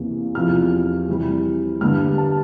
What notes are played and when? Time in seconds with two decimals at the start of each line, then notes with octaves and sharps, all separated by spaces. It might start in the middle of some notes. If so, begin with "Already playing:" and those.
Already playing: E2 C3 E3 A#3
0.35 E2 C3 F3 F6
1.08 C3 E3 G3
1.81 G2 D3 G3 F6
2.18 A5